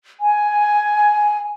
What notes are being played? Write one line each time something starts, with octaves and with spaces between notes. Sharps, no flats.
G#5